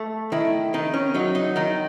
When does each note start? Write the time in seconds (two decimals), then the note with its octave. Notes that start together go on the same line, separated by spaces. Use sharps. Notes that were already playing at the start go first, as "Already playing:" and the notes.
Already playing: A3
0.32 D#3 E4
0.74 D#3 D#4
0.94 C#4
1.14 F#3 D#4
1.35 D#4
1.56 D#3 D#4